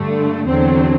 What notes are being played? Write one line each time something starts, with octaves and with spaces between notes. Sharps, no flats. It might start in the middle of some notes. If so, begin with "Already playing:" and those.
Already playing: G2 D3 A3
E2 D3 F#3 C4